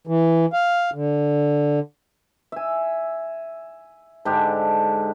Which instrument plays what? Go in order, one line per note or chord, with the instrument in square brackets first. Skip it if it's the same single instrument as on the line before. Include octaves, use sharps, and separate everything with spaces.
[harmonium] E3
F5
D3
[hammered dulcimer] E5 G#5
G#2 D3 D4 G4